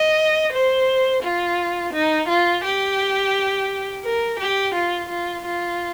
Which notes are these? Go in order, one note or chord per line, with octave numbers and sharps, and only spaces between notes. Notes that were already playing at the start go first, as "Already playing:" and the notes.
Already playing: D#5
C5
F4
D#4
F4
G4
A#4
G4
F4
F4
F4